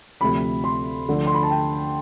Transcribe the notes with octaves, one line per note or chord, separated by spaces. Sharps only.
D2 C3 F3 B5
C6
D2 D3 F3
C6
B5
A5
G5